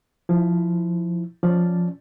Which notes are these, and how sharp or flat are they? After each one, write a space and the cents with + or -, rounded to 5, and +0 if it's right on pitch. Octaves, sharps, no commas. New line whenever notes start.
F3 +0 E4 +0
F3 +10 C#4 +5 D5 +0